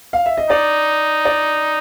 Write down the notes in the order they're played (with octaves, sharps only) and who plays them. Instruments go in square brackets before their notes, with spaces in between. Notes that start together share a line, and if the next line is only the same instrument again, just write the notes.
[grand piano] F5
E5
D#5
[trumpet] D#4 [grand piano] D5
[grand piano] D5